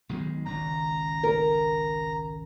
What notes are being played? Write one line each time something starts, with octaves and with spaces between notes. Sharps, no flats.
B1 D#3 G#3
G#1 C#2 A#5
A#4